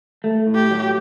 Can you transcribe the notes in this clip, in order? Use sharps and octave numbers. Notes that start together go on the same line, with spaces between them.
A3
A2
G4
F#3